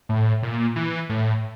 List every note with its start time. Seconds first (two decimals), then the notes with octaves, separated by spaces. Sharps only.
0.09 A2
0.43 A#2
0.76 E3
1.09 A2